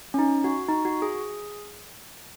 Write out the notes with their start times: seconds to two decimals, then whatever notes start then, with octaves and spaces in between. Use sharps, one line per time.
0.14 C#4
0.19 D#4
0.44 F#4
0.68 D#4
0.85 F#4
1.02 G#4